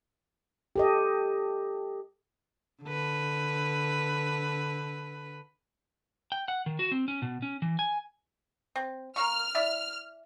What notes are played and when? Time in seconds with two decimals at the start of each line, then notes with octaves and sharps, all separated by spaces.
0.76 G4 A4 D#5
2.83 D3 B4
6.32 G5
6.48 F#5
6.66 D#3
6.79 F#4
6.92 C4
7.08 C#4
7.22 B2
7.42 C#4
7.62 E3
7.79 G#5
8.76 C4
9.16 A#3 F5 C#6 F6
9.55 E4 D5 E5